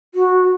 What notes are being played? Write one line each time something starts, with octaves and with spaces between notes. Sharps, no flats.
F#4